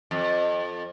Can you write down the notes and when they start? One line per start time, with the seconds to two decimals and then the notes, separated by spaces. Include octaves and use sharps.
0.11 F2